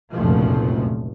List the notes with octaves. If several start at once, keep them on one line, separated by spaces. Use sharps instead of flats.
F1 C#2 F#2 A#2 F3 A3